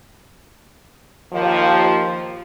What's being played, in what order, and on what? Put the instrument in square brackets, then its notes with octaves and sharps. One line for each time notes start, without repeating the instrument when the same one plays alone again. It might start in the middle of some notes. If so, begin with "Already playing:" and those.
[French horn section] D#2 F3